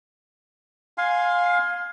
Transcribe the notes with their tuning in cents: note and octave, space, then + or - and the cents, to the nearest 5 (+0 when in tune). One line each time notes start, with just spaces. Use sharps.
F5 +20 G#5 +0 C6 +0